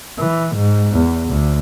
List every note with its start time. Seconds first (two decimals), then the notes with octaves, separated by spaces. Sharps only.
0.19 E3
0.56 G#2
0.93 E2
1.29 D2